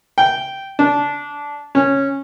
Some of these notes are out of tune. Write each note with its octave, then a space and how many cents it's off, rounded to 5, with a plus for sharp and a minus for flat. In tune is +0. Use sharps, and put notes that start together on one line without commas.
G5 -10
D4 -15
C#4 -10